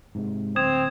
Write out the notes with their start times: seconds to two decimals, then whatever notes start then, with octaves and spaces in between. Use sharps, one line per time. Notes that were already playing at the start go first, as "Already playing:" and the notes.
0.15 G#2 C3 G#3
0.56 D1 C4 D#6 G#6 E7